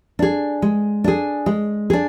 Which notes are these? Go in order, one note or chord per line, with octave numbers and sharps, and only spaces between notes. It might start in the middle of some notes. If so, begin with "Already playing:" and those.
D4 G#4
G#3
D4 G#4
G#3
D4 G#4